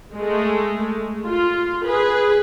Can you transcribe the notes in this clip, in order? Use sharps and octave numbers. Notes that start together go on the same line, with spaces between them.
G#3 A3
F4
G#4 B4